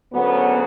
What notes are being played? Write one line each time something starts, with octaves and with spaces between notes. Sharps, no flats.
D2 C#3 F#3 B3